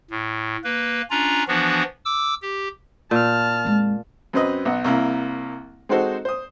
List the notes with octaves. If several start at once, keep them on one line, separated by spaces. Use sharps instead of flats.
A2
A#3 B4
C#4 D4 F4 A#5
E3 F3 B3 D4 F#4
D6 E6
G4
A#2 A5 F6
F2 G#3
F#2 F#3 C4 B4 D#5
B1 D#5 F#5
C2 A#3 E4 A#5
G#3 C4 D#4 F#4 A4 C5
C5 D#6